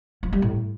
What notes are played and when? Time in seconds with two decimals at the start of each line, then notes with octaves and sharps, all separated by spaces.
0.23 F3
0.33 G3
0.42 A2